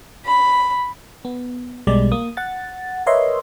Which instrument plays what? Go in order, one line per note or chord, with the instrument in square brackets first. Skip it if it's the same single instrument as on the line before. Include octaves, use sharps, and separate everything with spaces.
[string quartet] B5
[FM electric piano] B3
B1 B2 G3 G#3 D5
A#3 D#6
F#5 A6
A#4 B4 C#5 D#5 E5 C6